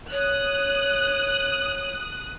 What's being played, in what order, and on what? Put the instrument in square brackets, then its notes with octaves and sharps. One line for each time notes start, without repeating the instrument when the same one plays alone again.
[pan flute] C#5 [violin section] D#6 F#6